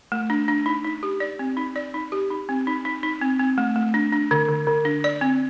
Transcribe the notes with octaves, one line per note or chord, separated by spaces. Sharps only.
A3
D4
D4
D#4
D#4
G4
D5
C4
D#4
D5
D#4
G4
D#4
C4
D#4
D#4
D#4
C4
C4
A3
A3
D4
D4
D3
D3
D3
D4
D5
C4